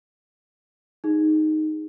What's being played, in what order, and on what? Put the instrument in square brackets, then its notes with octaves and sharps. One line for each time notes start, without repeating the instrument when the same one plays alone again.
[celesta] D#4 G#4